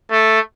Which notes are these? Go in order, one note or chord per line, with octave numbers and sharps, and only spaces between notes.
A3